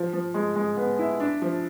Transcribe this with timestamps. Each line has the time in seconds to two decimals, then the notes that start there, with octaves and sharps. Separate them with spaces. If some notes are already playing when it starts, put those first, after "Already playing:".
Already playing: F3
0.13 F3
0.34 G#3
0.56 G#3
0.77 B3
0.99 E4
1.20 D4
1.42 F3